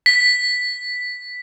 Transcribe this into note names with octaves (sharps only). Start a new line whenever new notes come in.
B6